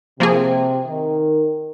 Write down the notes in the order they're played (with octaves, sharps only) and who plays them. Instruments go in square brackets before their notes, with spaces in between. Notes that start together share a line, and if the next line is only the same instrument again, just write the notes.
[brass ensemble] C3 [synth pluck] F3 A#3 G#4
[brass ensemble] D#3